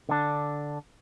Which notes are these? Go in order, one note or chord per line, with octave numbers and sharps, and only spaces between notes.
D3 D4